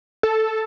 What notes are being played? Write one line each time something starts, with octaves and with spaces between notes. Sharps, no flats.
A4